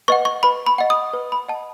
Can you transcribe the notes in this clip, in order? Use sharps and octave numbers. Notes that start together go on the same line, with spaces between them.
B4 D#5 F#5 C#6
C#6
B4 B5
B5
D#5 F#5
D#6
B4
B5
D#5 F#5 A5